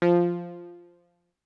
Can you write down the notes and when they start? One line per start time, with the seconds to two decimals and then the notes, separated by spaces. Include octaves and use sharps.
0.02 F3